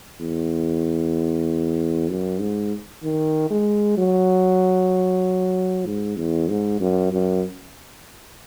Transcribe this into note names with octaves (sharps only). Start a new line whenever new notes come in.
E2
F#2
G#2
D#3
G#3
F#3
G#2
E2
G#2
F#2
F#2